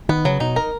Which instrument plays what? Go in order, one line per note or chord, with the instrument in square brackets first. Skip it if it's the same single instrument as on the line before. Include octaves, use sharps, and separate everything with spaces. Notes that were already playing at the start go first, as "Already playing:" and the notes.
[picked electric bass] D#3 [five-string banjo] B3
[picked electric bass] C#3 [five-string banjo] F#3
[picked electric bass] B2 [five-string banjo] D#4
[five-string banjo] A#4